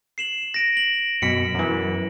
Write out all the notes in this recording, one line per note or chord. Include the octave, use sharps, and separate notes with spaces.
C7 E7 F#7
A#6 D7
F#7
F#2 B2 B6 C#7
F#2 E3